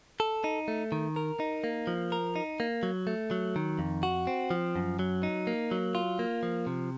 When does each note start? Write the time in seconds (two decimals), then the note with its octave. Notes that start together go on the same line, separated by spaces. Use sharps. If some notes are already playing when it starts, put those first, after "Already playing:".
0.20 A4
0.44 D#4
0.68 A3
0.92 D#3
1.16 A#4
1.40 D#4
1.64 A#3
1.87 F3
2.12 A#4
2.36 D#4
2.60 A#3
2.83 F#3
3.07 A3
3.31 F#3
3.56 D#3
3.79 F2
4.03 F#4
4.27 C4
4.50 F3
4.75 F#2
4.99 F#3
5.23 D#4
5.47 A#3
5.71 F#3
5.95 F4
6.19 A#3
6.43 F3
6.67 C3